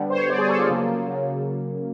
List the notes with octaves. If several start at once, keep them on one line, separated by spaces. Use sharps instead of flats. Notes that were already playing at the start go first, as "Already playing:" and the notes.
Already playing: D3 G3 B3
C5
C#5
D3 G3 B3 D5
G#4
A4
F4
C#3 F#3 A#3
C#3 F#3 A#3